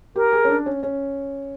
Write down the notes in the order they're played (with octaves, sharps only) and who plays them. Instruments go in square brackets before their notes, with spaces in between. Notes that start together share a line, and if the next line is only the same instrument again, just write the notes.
[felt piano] G4 [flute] A#4
[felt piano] G#4
C#4
D4
C#4
C#4